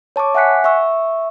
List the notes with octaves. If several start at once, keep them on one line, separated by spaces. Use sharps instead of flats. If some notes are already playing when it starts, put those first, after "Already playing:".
C#5 A5 C#6 D6
E5 F#5 G#5 F#6 B6 C#7
E5 C#6 E6